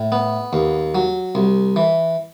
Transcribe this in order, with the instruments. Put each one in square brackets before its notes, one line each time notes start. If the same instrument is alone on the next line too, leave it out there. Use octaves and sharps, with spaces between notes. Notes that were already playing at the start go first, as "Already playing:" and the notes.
Already playing: [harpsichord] A2
B3
D#2
F#3
C2
E3